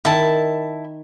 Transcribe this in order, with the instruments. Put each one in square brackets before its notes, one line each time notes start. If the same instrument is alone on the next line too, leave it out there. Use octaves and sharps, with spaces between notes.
[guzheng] D#3 [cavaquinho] E4 A5